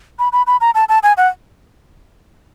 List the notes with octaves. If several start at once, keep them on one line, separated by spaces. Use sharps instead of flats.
B5
B5
B5
A#5
A5
A5
G#5
F#5